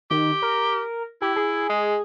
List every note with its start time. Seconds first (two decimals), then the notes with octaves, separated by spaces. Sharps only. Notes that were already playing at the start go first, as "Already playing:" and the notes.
0.11 D#3 G4
0.42 A#4
1.22 E4 G4
1.36 G#4
1.69 G#3